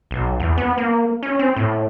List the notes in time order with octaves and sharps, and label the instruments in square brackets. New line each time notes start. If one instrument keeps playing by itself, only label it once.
[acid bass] B1
E2
B3
A#3
C#4
C4
A2